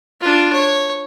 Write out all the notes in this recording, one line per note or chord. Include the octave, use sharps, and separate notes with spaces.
D4 F4
C#5